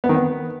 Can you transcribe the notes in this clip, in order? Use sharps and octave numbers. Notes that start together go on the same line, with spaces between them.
B3
D#3
B3